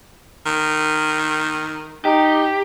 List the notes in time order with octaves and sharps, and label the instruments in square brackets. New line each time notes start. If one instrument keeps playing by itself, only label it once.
[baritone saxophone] D#3
[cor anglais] D#4 [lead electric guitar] G4